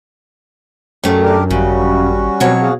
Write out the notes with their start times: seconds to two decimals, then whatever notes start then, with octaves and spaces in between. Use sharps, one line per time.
1.04 F#2 G3 A3
1.23 D4 G4 A#4
1.50 G#1 C#3 G3 C#4 F#4
2.40 B2 F3 F#3 C4 C#5
2.61 F#4 G#4 F5